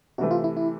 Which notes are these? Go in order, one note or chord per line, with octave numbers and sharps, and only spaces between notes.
C3 E3 A3 F#4
F4
E4
E4